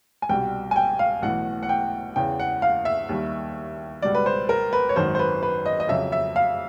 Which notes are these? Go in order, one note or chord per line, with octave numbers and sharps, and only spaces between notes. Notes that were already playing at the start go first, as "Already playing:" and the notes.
G#5
C2 B2 G3 G5
G#5
G5
F5
B1 A2 E3 F#5
F#5
G5
E2 C#3 E3 G5
F#5
F5
E5
D#2 D#3 G3
C#2 B2 G3 D5
B4
C5
A#4
B4
C#5
G#1 F#2 D#3 C5
C5
B4
B4
D#5
D#5
F2 C#3 F#3 E5
E5
F5